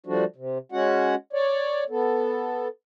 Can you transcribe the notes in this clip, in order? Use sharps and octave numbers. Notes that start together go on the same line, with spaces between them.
F3 G3 A3 D4 F#4
C3
G#3 C#4 F#4 F#5
C#5 D5
B3 A4